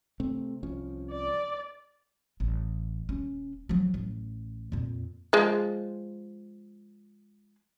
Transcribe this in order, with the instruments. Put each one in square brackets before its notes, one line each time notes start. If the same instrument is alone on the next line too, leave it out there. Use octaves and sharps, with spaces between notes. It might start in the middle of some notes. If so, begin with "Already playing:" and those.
[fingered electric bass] C3 A3 C4
C2 F3 C#4
[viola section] D5
[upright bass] A1
D#1 C#4
F3 F#3
A1
F2 A#2
[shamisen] F3 G#3